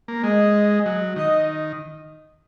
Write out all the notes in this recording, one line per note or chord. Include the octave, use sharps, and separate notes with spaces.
A#3
G#3 D#5
F#3
D#3 D#5